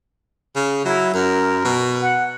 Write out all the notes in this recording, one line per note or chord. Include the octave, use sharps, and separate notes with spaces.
C#3
F#3 E4
F#2 A#4
B2
F#5